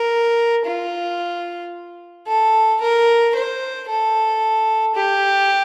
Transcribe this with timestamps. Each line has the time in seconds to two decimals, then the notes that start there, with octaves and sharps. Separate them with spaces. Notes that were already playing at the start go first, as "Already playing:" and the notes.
Already playing: A#4
0.66 F4
2.27 A4
2.81 A#4
3.35 C5
3.88 A4
4.95 G4